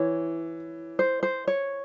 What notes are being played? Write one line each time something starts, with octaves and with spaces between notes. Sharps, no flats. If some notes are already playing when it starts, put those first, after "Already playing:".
Already playing: E3 C#5
C5
C5
C#5